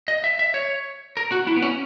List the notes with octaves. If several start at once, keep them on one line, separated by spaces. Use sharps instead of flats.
D#5
E5
E5
C#5
A#4
F#4
E4
B3
C#4